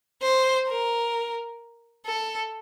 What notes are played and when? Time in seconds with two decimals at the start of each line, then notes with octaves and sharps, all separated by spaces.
0.22 C5
0.69 A#4
2.06 A4